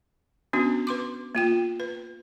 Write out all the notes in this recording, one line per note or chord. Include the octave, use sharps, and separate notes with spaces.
B3 C#4 D4 F#4
B4 C6 D6
A#3 F4 G5
B4